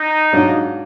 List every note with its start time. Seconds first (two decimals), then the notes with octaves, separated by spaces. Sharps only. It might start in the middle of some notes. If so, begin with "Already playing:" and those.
Already playing: D#4
0.33 G#2 F#3 D4 F4